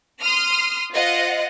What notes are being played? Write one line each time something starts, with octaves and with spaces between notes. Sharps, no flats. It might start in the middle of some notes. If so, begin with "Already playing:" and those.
C6 D#6 F6
F4 C5 D#5 F#5